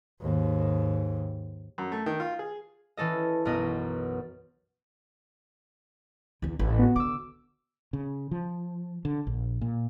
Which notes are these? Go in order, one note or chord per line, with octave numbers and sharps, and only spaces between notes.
D#2 G#2
F#2
A3
D#3
F4
G#4
E3 C#4 A4 D#5
B1 F#2 B3 D#5
E2 D3
A1
B3 F#4
D3 D6 E6
C#3
F3
D3
A#1
A#2